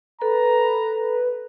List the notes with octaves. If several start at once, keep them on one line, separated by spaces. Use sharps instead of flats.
A4 B4 A#5